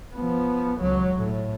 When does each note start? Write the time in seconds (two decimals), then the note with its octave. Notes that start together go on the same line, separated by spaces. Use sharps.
0.15 F3 B3
0.81 C#2 F#3
1.16 A2